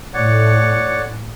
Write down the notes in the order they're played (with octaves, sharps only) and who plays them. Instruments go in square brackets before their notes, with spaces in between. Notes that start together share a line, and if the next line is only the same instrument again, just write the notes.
[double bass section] A2 [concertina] C#5 D5 F#5